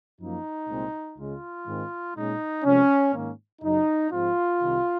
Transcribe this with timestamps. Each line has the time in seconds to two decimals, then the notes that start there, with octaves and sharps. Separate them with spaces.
0.18 F#2 F3 A#3 D#4
0.67 C2 A#2 G#3 C4
1.16 C#2 C#3 G#3 F4
1.66 G#2 D#3 G#3 C4
2.14 A#2 G#3 C#4 D#4
2.64 C3 F3 G#3 C#4
3.12 G#2 D#3 A#3 C#4
3.62 F#2 C#3 F#3 D#4
4.11 G#2 F3 G#3 C4 F4
4.61 C2 C3 D#3